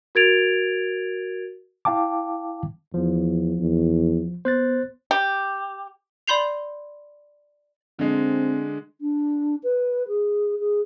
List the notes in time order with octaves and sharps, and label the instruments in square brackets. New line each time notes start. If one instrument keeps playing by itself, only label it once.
[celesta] F#4 A#4 G#6 A6 D7 F7
[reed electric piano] E4 F5 G5 A5 D6
[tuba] E2 [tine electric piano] F3
[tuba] E2
[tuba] B3 [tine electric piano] C5 F#6 A6
[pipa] G4
[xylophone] D5 B5 C6 G6 C7 F7
[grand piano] D3 G#3 [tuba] C4
[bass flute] D4
B4
G#4
G#4